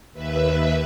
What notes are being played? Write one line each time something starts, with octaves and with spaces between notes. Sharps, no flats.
D#2 B4 E5